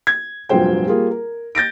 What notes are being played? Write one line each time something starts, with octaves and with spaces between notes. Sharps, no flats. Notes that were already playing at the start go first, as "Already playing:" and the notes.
G#6
F1 G2 A#2 F#3 C5 G5
G3 A#3 F4 G#4
A#4
G6 A6 A#6 D7